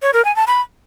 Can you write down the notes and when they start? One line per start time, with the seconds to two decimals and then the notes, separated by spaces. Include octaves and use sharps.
0.02 C#5
0.14 A#4
0.25 G#5
0.36 A5
0.47 B5